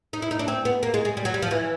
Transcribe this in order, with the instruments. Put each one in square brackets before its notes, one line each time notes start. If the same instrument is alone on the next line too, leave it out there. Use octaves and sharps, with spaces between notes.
[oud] D#4
E4
D#4
D4
C4
B3
A#3
G#3
G#3
G3
F#3
G3
F3
E3